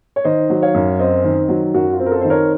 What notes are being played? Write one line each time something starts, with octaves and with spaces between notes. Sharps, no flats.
C#5
D#3 C5 D#5
F#3
C#5 F5
F#2
C4 C5 D#5
D#3
F#3
F#2 F#4
F4
C4
A#4
F4 A4
D#3 C5
A#4 C#5